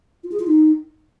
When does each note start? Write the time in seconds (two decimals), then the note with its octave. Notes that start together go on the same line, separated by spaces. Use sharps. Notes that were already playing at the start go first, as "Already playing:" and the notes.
0.24 F4
0.32 G#4
0.40 F4
0.48 D#4